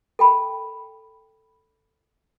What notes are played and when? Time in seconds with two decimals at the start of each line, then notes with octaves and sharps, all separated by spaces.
0.19 A4 G5 B5